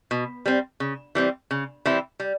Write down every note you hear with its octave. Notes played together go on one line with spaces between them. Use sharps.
B2
G3 C4
C#3
E3 G3 C4
C#3
E3 G3 C4 E4
G3